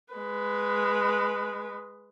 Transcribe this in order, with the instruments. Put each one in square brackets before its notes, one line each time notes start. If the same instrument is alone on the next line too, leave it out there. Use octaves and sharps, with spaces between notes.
[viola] G#3 B4